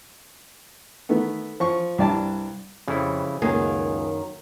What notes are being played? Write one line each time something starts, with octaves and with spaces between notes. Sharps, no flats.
D#3 A3 B3
F3 C#6
C2 G2 D5 A5
F2 C#3 G3 E4
C#2 F#2 D#3 A#3 G#4